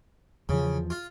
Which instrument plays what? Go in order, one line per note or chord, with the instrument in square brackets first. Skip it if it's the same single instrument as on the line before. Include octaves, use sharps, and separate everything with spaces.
[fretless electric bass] E2 F3 [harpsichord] C#3
[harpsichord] F4